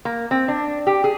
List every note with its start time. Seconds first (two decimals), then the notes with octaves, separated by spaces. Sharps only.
0.05 A#3
0.31 C4
0.48 D4
0.87 G4
1.04 G#4